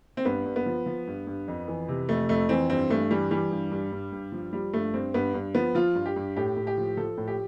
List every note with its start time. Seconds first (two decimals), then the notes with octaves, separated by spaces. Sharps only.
0.17 C4
0.25 G2 B3
0.46 G2
0.56 B3
0.66 F3
0.86 F3
1.07 G2
1.27 G2
1.48 F2
1.68 E3
1.88 C3
2.09 F2 A3
2.29 F2 A3
2.49 E3 C4
2.70 G2 C4
2.90 G2 A3
3.10 E3 G3
3.31 E3 G3
3.51 G2
3.72 G2
3.92 G2
4.12 G2
4.32 F3
4.53 F3 G3
4.73 G2 A3
4.93 G2 C4
5.14 G2 B3
5.34 G2
5.55 F3 B3
5.75 F3 F4
5.95 G2
6.06 G4
6.16 G2
6.36 A2 G4
6.57 A2
6.67 G4
6.77 F3
6.97 F3 A4
7.18 A2
7.28 G4